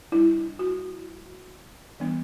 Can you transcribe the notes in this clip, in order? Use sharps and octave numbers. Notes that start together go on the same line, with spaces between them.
G3 D4 E4
F#4
E3 G3 B3 D4